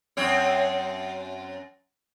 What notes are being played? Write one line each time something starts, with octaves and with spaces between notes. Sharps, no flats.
F#2 C4 C#5